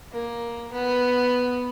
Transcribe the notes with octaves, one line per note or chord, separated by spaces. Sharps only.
A#3
B3